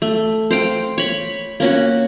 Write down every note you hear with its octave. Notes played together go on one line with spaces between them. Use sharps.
A3
C5 F5 G5
C#5 B5
A#3 C#4 F#4